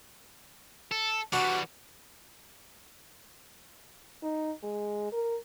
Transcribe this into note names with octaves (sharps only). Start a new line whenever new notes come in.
A4
E3 G3 D4 F#4
D#4
G#3
A#4